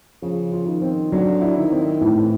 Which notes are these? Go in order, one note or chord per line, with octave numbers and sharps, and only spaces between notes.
C#3 F3
F4
D#3
C4
D3 F#3
E4
D#3
C4
A2 E3
E3